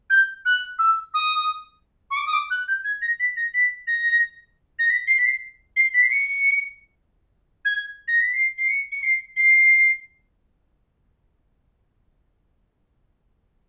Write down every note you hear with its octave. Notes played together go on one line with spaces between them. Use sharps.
G6
F#6
E6
D#6
C#6
D6
D#6
D6
F#6
G6
G#6
A#6
B6
A#6
B6
A#6
A#6
B6
C7
B6
C7
C7
B6
C7
C#7
G#6
A#6
B6
C7
C7
C#7
C#7
C7
C7